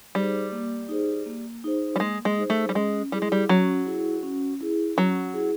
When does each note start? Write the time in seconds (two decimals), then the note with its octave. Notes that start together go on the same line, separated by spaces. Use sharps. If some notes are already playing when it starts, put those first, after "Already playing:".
0.15 G3 D#4 G#4 C5
0.52 A#3
0.89 D#4 G#4 C5
1.26 A#3
1.64 D#4 G#4 C5
1.96 G3
2.00 G#3 A#3
2.25 G#3
2.38 D#4 G#4 C5
2.50 A3
2.69 G3
2.75 G#3 C#4
3.12 G3 E4 G#4
3.22 G#3
3.32 G3
3.49 F#3 C#4
3.86 E4 G#4
4.23 C#4
4.61 E4 G#4
4.97 F#3 C#4
5.34 E4 G#4